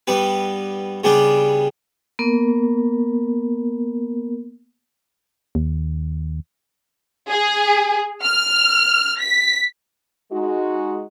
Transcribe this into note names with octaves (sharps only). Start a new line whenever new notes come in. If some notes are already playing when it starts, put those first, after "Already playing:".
G2 G3 B3 B4
C#3 G3 B3 D4 G4
A#3 B3 A#4
D#2
G#4
F6
B6
G#3 D#4 F#4